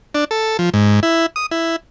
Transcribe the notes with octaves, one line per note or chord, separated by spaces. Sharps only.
D4
A4
F3
G#2
E4
D#6
E4